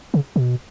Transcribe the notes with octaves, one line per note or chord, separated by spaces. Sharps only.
C#3
B2